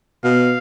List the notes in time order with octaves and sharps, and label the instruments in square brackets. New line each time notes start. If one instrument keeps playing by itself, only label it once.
[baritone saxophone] B2 [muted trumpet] F5